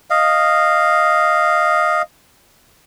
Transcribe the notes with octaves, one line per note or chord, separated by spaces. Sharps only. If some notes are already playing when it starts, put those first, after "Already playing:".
D#5 F5